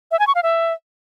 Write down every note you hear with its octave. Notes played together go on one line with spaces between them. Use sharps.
E5
G#5
C#6
F5
E5